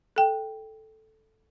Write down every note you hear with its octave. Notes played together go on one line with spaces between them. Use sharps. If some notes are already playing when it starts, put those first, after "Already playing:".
A4 G5